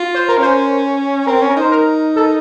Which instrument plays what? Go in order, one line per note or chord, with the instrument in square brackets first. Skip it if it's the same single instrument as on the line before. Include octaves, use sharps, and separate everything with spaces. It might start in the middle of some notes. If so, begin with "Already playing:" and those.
Already playing: [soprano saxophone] F4
[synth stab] C5
A#4
[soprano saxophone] C#4 [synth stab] C5
[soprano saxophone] C4 [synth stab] A#4
[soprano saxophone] C#4
[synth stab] A#4
[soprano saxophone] D#4 [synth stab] C5
[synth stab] A#4
A4